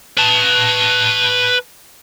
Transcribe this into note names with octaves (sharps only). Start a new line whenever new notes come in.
B4 A5